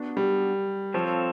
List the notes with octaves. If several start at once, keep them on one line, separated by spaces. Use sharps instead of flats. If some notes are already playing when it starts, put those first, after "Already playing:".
Already playing: B3 D4 F#4
G3
F3 C4 F4 A4 C#5